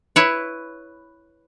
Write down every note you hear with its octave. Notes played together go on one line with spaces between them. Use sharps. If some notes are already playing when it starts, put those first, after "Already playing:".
E4 B4 C#5